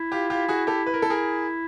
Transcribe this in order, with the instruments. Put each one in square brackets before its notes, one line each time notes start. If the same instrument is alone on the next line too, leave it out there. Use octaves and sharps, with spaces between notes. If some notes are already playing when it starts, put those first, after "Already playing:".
Already playing: [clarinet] E4
[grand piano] F4 G4
F4 G4
F#4 G#4
G4 A4
B4
A#4
A4
G#4 A#4